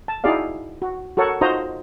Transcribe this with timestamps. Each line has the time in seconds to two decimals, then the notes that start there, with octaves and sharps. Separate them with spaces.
0.08 A5
0.24 D#4 E4 F#4 G#4 D5 F5
0.82 F#4
1.17 F#4 A4 A#4 C#5 F#5
1.41 D#4 F4 F#4 C5 D#5 A#5